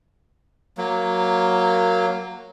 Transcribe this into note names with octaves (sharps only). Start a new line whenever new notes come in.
F#3 A#3